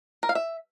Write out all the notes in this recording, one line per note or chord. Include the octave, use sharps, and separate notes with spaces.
A#4
F5
E5